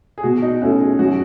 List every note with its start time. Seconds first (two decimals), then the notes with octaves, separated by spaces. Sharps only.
0.18 G#4
0.23 B2 F#4
0.42 D#4
0.62 A3 C#4 E4 F#4
0.80 G#4
0.99 F#2 F#4